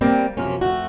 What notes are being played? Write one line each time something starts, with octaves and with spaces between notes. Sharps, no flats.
G3 A#3 C4 D5
F#2 C3 F3 A#3 C#4
F2 A3 F#4